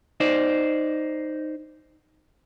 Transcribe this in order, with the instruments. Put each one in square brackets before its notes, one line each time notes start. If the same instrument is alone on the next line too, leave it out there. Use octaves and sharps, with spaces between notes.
[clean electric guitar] D#4 C5 D5